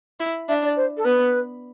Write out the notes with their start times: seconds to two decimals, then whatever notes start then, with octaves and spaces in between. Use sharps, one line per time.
0.20 E4
0.48 D4 E5
0.63 D5
0.76 C5
0.97 A4
1.05 B3 B4